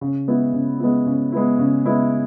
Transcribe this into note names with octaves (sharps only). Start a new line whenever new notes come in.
C#3
G#3 B3 E4
C#3
G#3 B3 E4
C#3
G#3 B3 E4
C#3
G#3 B3 E4